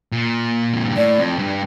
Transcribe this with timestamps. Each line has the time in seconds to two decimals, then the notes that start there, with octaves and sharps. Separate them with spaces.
0.12 A#2
0.74 F2
0.85 G2
0.97 A2 D5
1.18 F2
1.39 G2